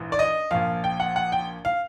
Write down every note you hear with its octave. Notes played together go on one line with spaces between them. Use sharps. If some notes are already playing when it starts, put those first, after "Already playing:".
Already playing: A#1 G#2 E3
D5
D#5
A#1 A#2 F3 F5
G5
F#5
F#5
G5
F5